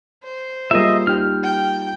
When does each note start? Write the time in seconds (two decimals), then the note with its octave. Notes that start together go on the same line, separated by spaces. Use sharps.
0.24 C5
0.71 G3 A#3 F4 G#4 D#5 E5 A#5
1.07 D#4 G4 F6
1.43 G5